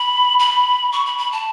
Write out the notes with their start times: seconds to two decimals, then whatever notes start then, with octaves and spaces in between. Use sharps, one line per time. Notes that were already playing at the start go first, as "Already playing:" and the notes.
Already playing: B5
0.39 B5
0.92 C#6
1.06 B5
1.18 B5
1.32 A5